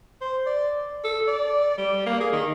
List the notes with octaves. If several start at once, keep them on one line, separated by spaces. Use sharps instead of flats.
C5
D5
A4
D5
G3
A#3
G#4
D#3